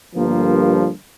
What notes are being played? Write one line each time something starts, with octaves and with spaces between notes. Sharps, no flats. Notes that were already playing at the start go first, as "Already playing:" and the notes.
G1 G2 F3 A#3